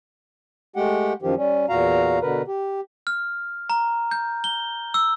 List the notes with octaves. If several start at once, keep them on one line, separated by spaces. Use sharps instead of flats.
G#3 A3 G4 F#5 G5
F#2 D#3 F3 G4
G3 C#4
E2 A#2 F#4 F5 A#5
B2 D3 A#4 B4
G4
F6
A#5
G6
G7
E6